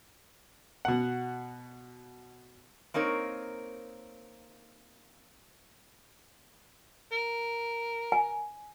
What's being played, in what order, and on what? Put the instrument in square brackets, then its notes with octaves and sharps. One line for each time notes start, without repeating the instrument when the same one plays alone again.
[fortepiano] B2 F#5
[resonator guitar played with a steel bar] A#3 C4 D#4 A#4 C#5
[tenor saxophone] A#4
[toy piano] G#5